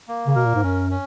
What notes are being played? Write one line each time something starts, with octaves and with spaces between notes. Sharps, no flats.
A#3
C#3
B2 A#4
A#2
G#2
F#2 C#4
C#4